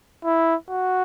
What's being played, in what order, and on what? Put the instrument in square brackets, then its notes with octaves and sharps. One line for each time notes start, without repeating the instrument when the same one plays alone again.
[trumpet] E4
F#4